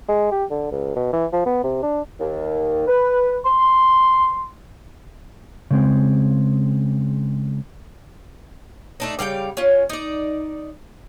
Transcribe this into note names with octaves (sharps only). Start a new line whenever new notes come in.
G#3
G4
D3
C#2
B2
E3
F3
B3
C3
D4
D#2
B4
C6
C#3 G#3 C4
A3 D4 D#4
C#3 G3 F5 G5
C#4 F4
D#4 D5